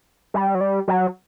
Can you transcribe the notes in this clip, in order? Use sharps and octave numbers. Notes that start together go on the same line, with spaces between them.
G3
F#3
G3
F#3